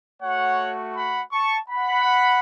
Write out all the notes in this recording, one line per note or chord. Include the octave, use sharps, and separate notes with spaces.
A3 F#4 C#5 F#5
F#5 B5
A5 C#6
F#5 B5